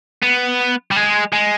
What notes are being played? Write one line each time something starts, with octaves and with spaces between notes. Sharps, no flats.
B3
G3
G#3
G#3